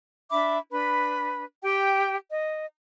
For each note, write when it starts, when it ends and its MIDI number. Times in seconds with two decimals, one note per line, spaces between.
0.30 0.57 62
0.30 0.57 76
0.30 0.57 83
0.30 0.57 86
0.72 1.44 62
0.72 1.44 71
0.72 1.44 83
1.63 2.16 67
1.63 2.16 79
2.31 2.67 75